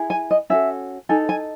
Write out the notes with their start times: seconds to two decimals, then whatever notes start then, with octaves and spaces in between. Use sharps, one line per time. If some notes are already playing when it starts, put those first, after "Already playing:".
Already playing: E4 G#4
0.10 G#5
0.31 D#5
0.50 C#4 F#4 A4 E5
1.09 D#4 A4 G#5
1.29 G#5